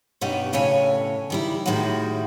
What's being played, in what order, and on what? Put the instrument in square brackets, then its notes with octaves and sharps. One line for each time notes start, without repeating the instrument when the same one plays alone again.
[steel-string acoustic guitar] G2 B2 C#4 D#4 F#4 G4
F2 A2 C#3 A4 C#5 G#5
D#3 G3 E4
A2 D#3 G3 G#3 E4 F#4